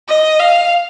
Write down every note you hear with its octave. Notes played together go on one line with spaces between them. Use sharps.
D#5
F5